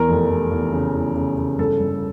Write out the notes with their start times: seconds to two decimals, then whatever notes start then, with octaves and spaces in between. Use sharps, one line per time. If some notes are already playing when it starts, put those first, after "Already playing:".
Already playing: E2 A#4
0.08 F1
0.30 F1
0.51 E2
0.72 C#3
0.94 E2
1.16 C#3
1.38 C#3
1.58 G1 A4
1.80 G1